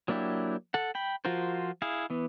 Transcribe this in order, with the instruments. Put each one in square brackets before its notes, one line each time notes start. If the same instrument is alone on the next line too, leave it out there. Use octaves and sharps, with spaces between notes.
[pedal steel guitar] F#3 A#3 D4 E4 G4
A4 F#5
G5 B5
F3 F4 F#4 A#4 C5
E4 G#4 F5
E3 B3